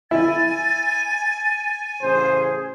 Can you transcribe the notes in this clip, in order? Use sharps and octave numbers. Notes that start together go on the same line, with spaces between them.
E4 G#5 A6
A1 C#3 G#4 C5